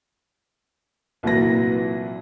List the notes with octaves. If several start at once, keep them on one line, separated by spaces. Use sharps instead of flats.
C2 A#2 E3 F#3 B4 A#6